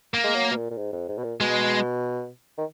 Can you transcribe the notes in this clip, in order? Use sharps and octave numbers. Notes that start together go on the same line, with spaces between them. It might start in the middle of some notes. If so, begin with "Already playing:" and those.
A#3
G#3
F#3
B2
A#2
A#2
G#2
F2
G#2
B2
A#2
B2 G#3
D#3